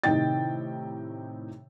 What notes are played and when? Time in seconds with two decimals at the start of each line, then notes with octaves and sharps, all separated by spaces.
0.04 A2 C3 D#3 D#4 G5 A6